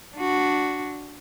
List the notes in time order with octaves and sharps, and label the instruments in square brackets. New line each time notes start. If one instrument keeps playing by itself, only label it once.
[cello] D4 F#4